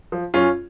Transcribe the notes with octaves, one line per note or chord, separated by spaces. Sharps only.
F3
F#2 C#4 F4